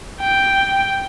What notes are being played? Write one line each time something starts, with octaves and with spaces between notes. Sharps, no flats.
G5